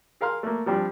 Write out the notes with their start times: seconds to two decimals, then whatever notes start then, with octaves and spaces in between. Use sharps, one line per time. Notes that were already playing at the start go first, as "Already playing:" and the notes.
0.21 G#4 A#4 F5 C6 F6
0.43 A3 A#3
0.66 F3 G3 C4 D4